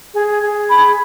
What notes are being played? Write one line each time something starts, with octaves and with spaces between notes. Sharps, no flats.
G#4
G#4
B5